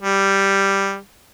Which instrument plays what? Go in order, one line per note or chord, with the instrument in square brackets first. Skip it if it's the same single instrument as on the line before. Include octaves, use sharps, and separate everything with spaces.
[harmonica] G3